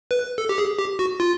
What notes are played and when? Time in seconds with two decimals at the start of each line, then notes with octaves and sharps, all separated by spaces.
0.11 B4
0.38 A4
0.49 G4
0.58 G#4
0.79 G4
0.99 F#4
1.20 F4